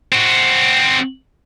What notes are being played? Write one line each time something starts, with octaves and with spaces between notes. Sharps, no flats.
C4 F#4